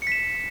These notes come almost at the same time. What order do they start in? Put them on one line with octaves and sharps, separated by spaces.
C#7 B6 E7